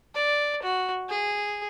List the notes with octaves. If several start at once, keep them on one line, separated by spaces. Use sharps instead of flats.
D5
F#4
G#4